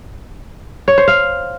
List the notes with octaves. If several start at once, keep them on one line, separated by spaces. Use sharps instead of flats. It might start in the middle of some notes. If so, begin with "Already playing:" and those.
C#5
C5
F5